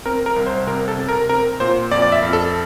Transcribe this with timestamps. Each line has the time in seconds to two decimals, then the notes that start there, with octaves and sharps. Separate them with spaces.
0.06 C4 A#4
0.26 A#4
0.36 C2
0.46 C5
0.67 C3 A#4
0.88 A4
0.98 C3
1.09 A#4
1.29 C4 A#4
1.60 A#2 C5
1.91 F2 D5
2.02 D5
2.12 E5
2.23 F2
2.33 A4